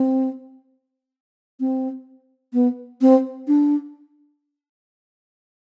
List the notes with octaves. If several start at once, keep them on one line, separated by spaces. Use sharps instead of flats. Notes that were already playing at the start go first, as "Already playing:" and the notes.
Already playing: C4
C4
B3
C4
D4